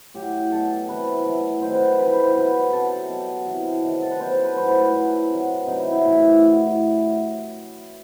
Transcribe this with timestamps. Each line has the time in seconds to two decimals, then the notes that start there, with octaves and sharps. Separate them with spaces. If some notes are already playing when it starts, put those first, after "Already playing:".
0.14 A2 F#3 G4
0.51 B2 F#3 A4
0.89 C3 E3 B4
1.25 A2 F#3
1.62 C3 D#3 F#3 C5
1.75 B4
1.86 C5
1.99 C3 E3 B4
2.12 C5
2.23 C5
2.36 B2 F#3 B4
2.73 C3 F#3 A4
3.09 B2 F#3
3.46 E3
3.51 C3
3.83 C3 D#3 F#3
4.02 A4
4.11 B4
4.20 B2 F#3 C5
4.32 C5
4.44 B4
4.57 A2 F#3 C5
4.69 B4
4.82 B4
4.93 A2 F#3
5.30 C3 F#3
5.67 C3 F#3 D#4
5.80 E4
5.92 E4
6.04 A2 E3
6.41 A2 F#3